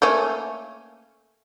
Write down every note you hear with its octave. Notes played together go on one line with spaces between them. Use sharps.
A3 A#3 C#4